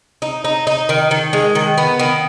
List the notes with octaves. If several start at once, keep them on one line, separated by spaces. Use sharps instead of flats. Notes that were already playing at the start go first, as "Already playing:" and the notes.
D#4
D#4
D#4
D#3
D#3
G#3
D#3
B3
D#3